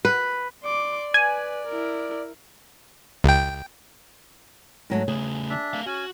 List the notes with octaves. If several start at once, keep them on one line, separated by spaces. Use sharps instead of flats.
B4
D5 C6 D6
B4 G#5
E4 A#4
C#2 G5
G#2 F#3 A3
C#3 A3 G#4
D4 E5
A3 F5
C#4 F#4 G#5